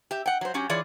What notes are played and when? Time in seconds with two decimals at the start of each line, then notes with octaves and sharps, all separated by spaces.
0.11 G4 E5
0.26 F#5 G5
0.41 F#3 C5
0.54 F#3 C#4 G4
0.70 E3 F4 G#4 C#5 D5